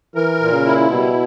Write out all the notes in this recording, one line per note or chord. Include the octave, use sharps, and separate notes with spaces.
E3 A#4
A#2
C#3
E4
B2 G3